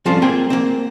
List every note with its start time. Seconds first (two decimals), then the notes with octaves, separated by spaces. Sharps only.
0.06 F3 G3 C4 C#4 F4 A4
0.22 A#3 C4 G#4 G5
0.50 A#3 C4